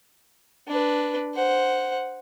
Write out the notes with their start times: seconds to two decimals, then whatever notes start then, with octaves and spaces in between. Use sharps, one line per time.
0.68 D4 B4
1.35 C5 F#5